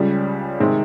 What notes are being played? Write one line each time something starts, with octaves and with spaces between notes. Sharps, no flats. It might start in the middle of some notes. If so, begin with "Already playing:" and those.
Already playing: C#2 C#3 G3
C3 D#3 G#3 C4